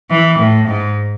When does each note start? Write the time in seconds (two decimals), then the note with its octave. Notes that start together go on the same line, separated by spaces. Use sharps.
0.10 E3
0.39 A2
0.68 G#2